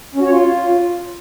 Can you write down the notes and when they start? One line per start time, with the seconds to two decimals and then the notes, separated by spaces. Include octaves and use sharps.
0.15 C#4
0.20 F#4
0.26 C#5
0.31 F4